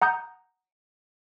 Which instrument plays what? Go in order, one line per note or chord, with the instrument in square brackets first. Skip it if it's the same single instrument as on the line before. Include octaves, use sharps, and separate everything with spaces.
[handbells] F#5 A#5 D#6 G6